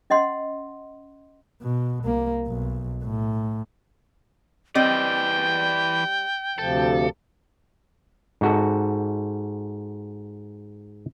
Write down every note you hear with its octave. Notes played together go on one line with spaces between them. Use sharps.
C#4 D#5 F#5 C6
B2
C2 A#3
B1
A2
E3 G3 C4 D5 D#5 G5
D2 C3 F3 A4
G#2 F#4 A4